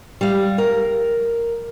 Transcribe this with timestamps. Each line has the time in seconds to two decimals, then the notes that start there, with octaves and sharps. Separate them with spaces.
0.21 G3 F5
0.58 A#4